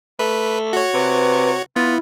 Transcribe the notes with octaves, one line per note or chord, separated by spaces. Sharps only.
A3 B4
F#4 C#5
C3 B4
B3 E4 F4